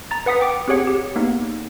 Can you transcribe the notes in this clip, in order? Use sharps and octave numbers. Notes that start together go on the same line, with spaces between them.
A#5 A6
B4 F#5 D#6 B6
G5 D6 D7
C4 G4 G#4 C#5 F#5 C#7
G4
A#3 B3 D#4